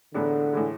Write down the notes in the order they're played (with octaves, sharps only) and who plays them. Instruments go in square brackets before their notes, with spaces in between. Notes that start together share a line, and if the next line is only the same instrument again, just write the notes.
[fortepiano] A1 A2 G#3 B3 D4 [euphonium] D3
[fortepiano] A2 E3 G#3